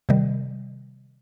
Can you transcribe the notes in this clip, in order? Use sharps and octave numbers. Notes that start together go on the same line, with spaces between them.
C3 D#3 G3